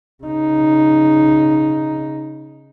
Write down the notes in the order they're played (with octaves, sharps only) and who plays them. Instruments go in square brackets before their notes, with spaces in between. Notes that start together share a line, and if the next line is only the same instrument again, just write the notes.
[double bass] C#3 D#4